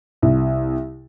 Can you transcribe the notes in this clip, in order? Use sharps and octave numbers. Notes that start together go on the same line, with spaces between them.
C2